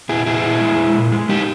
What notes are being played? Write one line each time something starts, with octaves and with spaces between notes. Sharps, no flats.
A#2 E4 G#4
A#2 E4 G#4
A#2
G#3
G#3
A#2
G#3
G#3 D#4 G4